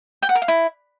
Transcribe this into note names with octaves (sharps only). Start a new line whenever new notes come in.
G5
F#5
A#4
F5
E4